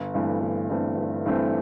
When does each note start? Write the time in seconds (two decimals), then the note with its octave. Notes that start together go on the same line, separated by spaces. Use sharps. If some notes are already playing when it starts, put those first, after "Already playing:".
Already playing: G1
0.14 G2 E3 A3 C4
0.41 G1
0.70 G2 E3 A3 C4
0.97 G1
1.25 G2 E3 A3 C4